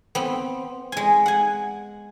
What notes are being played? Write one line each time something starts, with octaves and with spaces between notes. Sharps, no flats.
B3 C4
G#3 G#5
F#5 G#5